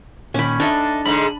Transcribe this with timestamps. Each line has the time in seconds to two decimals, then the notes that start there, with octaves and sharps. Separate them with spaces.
0.34 A#2 D#3 C#4 B5
0.60 D4 D#4 A4 E5
1.06 G#2 D3 B5